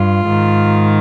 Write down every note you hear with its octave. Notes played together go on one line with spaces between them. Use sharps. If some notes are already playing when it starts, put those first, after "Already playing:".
Already playing: G2 F4
G#2 D#3